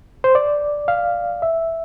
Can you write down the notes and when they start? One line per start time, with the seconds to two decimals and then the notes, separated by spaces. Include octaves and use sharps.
0.24 C5
0.35 D5
0.88 F5
1.42 E5